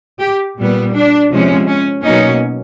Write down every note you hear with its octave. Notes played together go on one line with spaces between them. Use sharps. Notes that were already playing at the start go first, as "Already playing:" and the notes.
G4
A#2 G3 B3
D4
C3 F3 G#3 C#4
C#4
B2 F#3 A#3 C#4 D#4